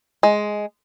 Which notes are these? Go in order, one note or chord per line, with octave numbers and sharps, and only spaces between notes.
G#3